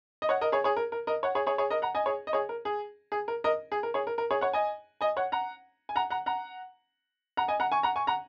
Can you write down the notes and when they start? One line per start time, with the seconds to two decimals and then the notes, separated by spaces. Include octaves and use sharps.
0.22 D#5
0.29 C#5 F#5
0.41 A#4 D#5
0.52 G#4 C#5
0.64 G#4 C#5
0.77 A#4
0.92 A#4
1.07 A#4 D#5
1.23 C#5 F#5
1.35 G#4 C#5
1.47 G#4 C#5
1.58 G#4 C#5
1.70 A#4 D#5
1.82 F#5 A#5
1.95 D#5 G#5
2.06 G#4 C#5
2.27 D#5
2.33 G#4 C#5
2.49 A#4
2.65 G#4
3.12 G#4
3.28 A#4
3.44 A#4 D#5
3.72 G#4
3.83 A#4
3.94 G#4 C#5
4.07 A#4
4.18 A#4
4.31 G#4 C#5
4.41 C#5 F#5
4.53 D#5 G#5
5.01 D#5 G#5
5.17 C#5 F#5
5.32 F#5 A#5
5.89 G#5
5.96 F#5 A#5
6.10 F#5 A#5
6.26 F#5 A#5
7.37 F#5 A#5
7.48 D#5 G#5
7.60 F#5 A#5
7.72 G#5 C#6
7.83 F#5 A#5
7.96 G#5 C#6
8.07 F#5 A#5